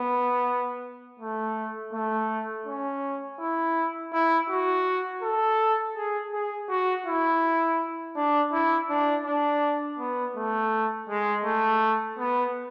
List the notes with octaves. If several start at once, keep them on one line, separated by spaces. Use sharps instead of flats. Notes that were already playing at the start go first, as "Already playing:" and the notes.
Already playing: B3
A3
A3
C#4
E4
E4
F#4
A4
G#4
G#4
F#4
E4
D4
E4
D4
D4
B3
A3
G#3
A3
B3